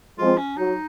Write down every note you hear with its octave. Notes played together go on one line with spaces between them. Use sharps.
F3 G#3 C4 F4
C#4
F#3 D#4